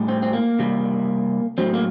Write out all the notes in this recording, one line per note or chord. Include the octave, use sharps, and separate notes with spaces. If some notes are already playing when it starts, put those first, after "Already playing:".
Already playing: A2 G3
C4
C4
A#3
C3 G3
A2 F#3 C4
A#3